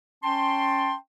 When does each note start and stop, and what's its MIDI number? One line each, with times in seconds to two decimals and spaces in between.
0.23 0.94 61
0.23 0.94 79
0.23 0.94 81
0.23 0.94 84